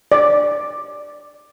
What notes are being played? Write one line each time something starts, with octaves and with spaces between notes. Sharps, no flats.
D5